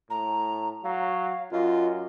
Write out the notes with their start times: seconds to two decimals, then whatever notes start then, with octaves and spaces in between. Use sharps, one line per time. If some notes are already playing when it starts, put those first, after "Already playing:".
0.10 A2 A#5
0.84 F#3 F5
1.52 F#2 F4 D#5